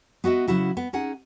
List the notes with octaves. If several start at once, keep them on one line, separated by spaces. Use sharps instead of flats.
B3 F#4 D#5 E5
C#3 F#3 E4 F#4
B3
C#4 D#4 G#4 F#5